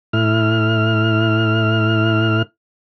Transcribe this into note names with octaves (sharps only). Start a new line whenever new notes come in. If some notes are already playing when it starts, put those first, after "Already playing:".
A2 E4 F6